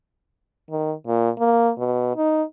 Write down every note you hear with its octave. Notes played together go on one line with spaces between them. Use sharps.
D#3
A#2
A#3
B2
D#4